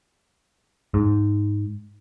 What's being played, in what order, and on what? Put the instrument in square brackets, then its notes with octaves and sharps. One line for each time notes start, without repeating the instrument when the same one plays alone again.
[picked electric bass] G#2